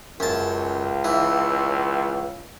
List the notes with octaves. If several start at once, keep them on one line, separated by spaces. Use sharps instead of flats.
C#2 F#2 A5
E3